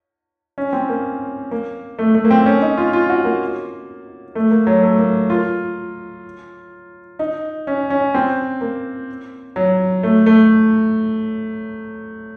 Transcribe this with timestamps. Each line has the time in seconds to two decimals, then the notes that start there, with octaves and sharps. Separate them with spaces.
0.58 C#4
0.73 C4
0.89 A#3
1.51 A#3
1.99 A3
2.15 A3
2.25 A#3
2.31 C4
2.46 C#4
2.62 D#4
2.77 F4
2.93 F4
3.10 F#4
3.25 A#3
4.35 A3
4.51 A#3
4.67 F#3
4.83 A3
4.98 A#3
5.30 F4
7.19 D#4
7.67 C#4
7.90 C#4
8.14 C4
8.61 A#3
9.56 F#3
10.03 A3
10.26 A3